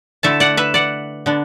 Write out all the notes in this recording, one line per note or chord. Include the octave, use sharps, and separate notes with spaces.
D3 A3 E4 E5 A5
D5 F#5
B4 E5
D5 F#5
D3 B3 D4